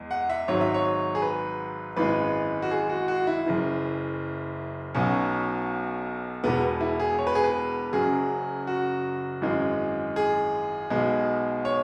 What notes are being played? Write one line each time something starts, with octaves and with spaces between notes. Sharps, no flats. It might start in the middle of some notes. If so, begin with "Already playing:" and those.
Already playing: E2 G#3
F#5
E5
G#1 G#2 F#3 C#5
E5
C#5
G#4
B4
G#1 F#2 E3 G#3 B4
F#4
G#4
F#4
F#4
E4
F#1 F#2 E3
B1 B2 F#3 C#4
E1 E2 B2 B3
E4
G#4
C#5
B4
G#4
B4
F#1 F#2 C#3 F#3 G#4
F#4
G#1 F#2 E3 G#3
G#4
B1 B2 G#3
C#5